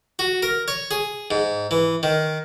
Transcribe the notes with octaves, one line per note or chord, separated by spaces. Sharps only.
F#4
A#4
C#5
G#4
G#2
E3
D#3